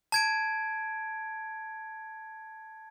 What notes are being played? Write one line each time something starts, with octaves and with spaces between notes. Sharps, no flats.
A5 G#6 D7